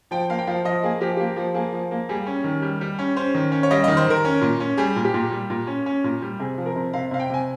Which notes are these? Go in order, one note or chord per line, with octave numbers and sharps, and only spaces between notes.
F3 G5
A#3 F5
G5
F3 F5
F3 D#5
A#3 G#4
F3 G4
A#3 G4
F3
A#3 G#4
F3
A#3
G3 G#4
C#4
D#3
G3
G3
C#4
C#4 C5
D#3
C#4
C#5
G3 D#5
D#3 D#5
C5
D#3 A#4
C#4
A#2
C#4
G3 G#4
A#2
G4
A#2
G3
A#2
C#4
C#4
A#2
G3
C3 G#4
F3
A#4
C3
C3 F5
C3 F5
G5
C3 G#5